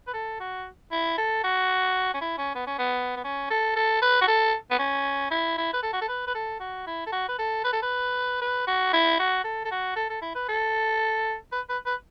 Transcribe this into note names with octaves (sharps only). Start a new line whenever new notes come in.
B4
A4
F#4
E4
A4
F#4
C#4
E4
C#4
B3
C#4
B3
B3
C#4
A4
A4
B4
F#4
A4
B3
C#4
E4
E4
B4
A4
F#4
A4
B4
B4
A4
F#4
E4
A4
F#4
B4
A4
B4
A4
B4
B4
F#4
E4
F#4
A4
A4
F#4
A4
A4
E4
B4
A4
B4
B4
B4